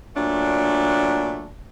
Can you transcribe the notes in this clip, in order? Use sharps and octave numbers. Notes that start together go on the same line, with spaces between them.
A#2 F#3 A3 D4